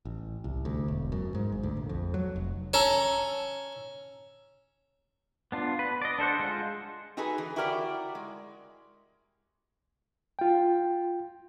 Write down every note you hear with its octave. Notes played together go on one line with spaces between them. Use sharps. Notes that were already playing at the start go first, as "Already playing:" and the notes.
A1
C2
D2
E1
F#2
G#2
G#1
D2
A#1
F2
F#3
F1
C#4 A4 A#5
B3 D4 F4
B4
D5 D#5
D4 A4 C5 F#5
G#3 F4
D#4 F#4 G#4 A4 B4 G#5
E3
E4 F#4 G4 A#4 B4 D5
G#3
F4 G5